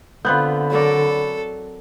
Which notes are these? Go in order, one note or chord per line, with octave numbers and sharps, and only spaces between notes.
D3 B3 C4 F4 B5 F#6 G6
F#3 A4 A#4 D5